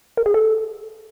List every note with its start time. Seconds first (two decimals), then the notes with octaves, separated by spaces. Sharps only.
0.17 A#4
0.26 G#4
0.34 A4